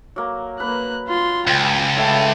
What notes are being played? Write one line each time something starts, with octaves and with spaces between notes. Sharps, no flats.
F#3 A#3
A#3 B4 F#6
F4 C6
C#2 G5
A2 E4 G5 A5